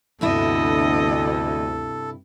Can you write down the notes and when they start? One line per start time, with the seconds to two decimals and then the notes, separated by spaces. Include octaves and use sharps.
0.21 D2 G2 C3 B3 E4 A4 D#5